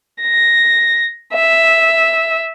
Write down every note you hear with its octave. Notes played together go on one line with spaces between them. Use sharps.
A#6
E5